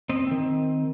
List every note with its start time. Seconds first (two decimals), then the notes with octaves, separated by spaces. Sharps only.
0.09 C4 D#5
0.27 D#3 C4